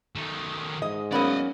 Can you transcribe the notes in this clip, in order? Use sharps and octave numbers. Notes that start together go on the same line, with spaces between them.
D#3 A3
G#2 D#5
F#3 A#3 B3 C#4 D5 D#5